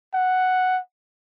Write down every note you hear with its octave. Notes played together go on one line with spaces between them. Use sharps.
F#5